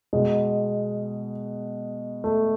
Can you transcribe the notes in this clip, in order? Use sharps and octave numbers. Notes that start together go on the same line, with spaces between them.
B2 G#3
A3